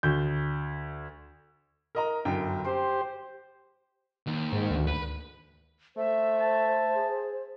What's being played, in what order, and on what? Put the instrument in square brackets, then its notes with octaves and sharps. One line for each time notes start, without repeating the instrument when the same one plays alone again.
[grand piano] D2 G6
[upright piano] A#4 D#5 A#5
G1 F#2 G5
[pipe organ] G4 C5 [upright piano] C6
[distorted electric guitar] D#2
[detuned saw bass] G#2
D2
[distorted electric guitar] B4
[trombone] A3 [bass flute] C5 [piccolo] E5
[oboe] A5
[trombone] G#4